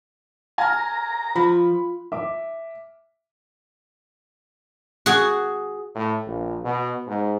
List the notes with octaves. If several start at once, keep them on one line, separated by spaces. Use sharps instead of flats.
G#5 A#5 F6
F3 F4 B5
E5 D6
F#4 G#4
A2
A#1
B2
G#2